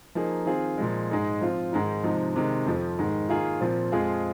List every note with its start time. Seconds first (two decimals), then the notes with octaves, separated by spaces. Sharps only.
0.15 F3 A#3 D#4 G#4
0.46 D#3 C4 F4 G#4
0.78 A#2 F3 G#3
1.10 G#2 G#3 D#4 G#4
1.41 F3 C4 F4
1.72 G#2 D#3 G#3 D#4
2.04 C3 F3 G#3 D#4
2.36 C3 D#3 G#3
2.67 F2 F3 C4
2.99 G#2 D#3 G#3
3.29 D#3 A#3 F4 G#4
3.61 A#2 F3 C4
3.92 F2 F3 G#3 F4 G#4